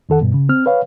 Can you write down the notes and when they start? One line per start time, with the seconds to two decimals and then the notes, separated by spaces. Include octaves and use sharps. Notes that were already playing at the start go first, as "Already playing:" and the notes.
0.09 F2 D#3 A4 F#5
0.21 G2 B2
0.34 C#3
0.49 C4 F6
0.66 B4 C#5 F5